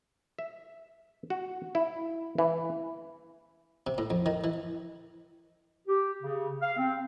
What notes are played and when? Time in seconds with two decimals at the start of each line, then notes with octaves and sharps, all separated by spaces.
0.39 E5
1.30 F#4
1.75 E4
2.38 E3
3.87 C3
3.98 A2
4.10 F2
4.26 D#3
4.44 E3
5.87 G4
6.23 C#3
6.61 F5
6.77 C4